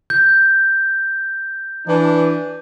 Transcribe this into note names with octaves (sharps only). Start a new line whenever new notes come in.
G6
E3 D4